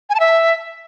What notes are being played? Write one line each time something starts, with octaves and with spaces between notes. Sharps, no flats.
G#5
A5
E5